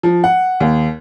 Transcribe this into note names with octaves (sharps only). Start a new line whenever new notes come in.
F3
F#5
D#2